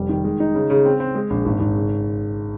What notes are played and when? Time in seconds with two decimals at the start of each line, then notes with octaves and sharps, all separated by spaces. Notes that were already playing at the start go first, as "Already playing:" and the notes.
Already playing: F1 G3
0.09 D#3
0.24 G#3
0.40 D#4
0.55 C#3
0.70 C#3
0.85 C4
1.00 C4
1.15 G#3
1.30 A#1
1.45 G#1
1.60 G#1
1.76 C#3